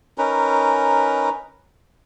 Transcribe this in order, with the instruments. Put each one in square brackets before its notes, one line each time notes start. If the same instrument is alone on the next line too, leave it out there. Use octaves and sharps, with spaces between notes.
[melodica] C#4 D#4 A#4 B4